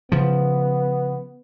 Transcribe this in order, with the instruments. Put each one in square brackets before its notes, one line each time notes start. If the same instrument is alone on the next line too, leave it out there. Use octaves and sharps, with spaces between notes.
[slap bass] C#3 F3 [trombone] B3